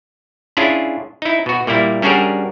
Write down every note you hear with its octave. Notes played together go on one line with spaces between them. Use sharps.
C#4 D4 E4 F4 G#4
D#4 E4
B2 F#4
A#2 G3 A#3 E4
G3 C#4 D4 F#4 G#4 A#4